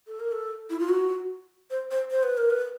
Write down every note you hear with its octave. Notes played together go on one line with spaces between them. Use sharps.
A4
A#4
A4
E4
F4
F#4
C5
C5
C5
B4
A#4
B4